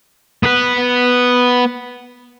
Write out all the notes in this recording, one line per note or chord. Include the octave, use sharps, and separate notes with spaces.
B3 B4